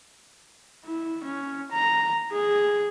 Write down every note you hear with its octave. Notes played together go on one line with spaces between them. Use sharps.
E4
C#4
A#5
G#4